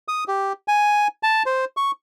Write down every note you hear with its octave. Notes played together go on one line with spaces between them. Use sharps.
D#6
G4
G#5
A5
C5
C#6